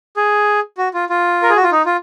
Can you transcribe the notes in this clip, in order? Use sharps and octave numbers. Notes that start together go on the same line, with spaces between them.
G#4
F#4
F4
F4
A#4
G#4
F#4
F4
D#4
F4